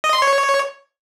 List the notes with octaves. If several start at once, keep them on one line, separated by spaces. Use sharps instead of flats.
D#5
C6
C#5